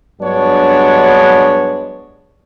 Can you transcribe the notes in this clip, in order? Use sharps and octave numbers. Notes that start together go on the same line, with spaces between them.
G2 F#3 G#3 B3 D4 C#5